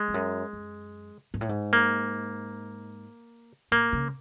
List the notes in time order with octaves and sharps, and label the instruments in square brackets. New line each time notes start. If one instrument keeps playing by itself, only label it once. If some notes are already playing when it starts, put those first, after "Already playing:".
Already playing: [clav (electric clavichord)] G#3
[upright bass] F2
F#2
F#2
G#2
A2
G#2
[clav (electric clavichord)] A#3
[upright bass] A2 [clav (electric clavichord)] A#3
[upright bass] C#3